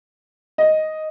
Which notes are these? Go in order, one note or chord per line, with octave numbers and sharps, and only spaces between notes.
D#5